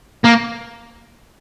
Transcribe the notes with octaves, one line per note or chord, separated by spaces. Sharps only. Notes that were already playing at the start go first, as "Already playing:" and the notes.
A#3